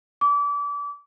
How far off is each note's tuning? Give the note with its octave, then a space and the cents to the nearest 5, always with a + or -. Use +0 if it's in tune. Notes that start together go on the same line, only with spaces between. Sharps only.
D6 -30